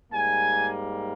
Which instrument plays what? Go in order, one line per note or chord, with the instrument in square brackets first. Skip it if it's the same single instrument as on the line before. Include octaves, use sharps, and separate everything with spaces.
[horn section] G#2 G3 A#3 G#5